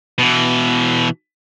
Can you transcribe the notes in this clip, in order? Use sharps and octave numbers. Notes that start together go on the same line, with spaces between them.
B2 E3